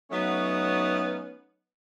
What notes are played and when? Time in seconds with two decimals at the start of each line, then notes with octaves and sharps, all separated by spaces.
0.10 F#3 A3 B3 C#4 D#4